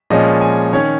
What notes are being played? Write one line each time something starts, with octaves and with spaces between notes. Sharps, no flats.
A#2 F3 G#3 C#4 D#5
G#5
D#3 C#4 C#5